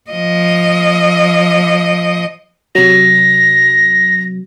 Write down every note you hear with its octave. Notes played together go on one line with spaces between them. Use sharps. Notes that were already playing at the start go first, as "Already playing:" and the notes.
F3 D#5
C3 F#3 A#6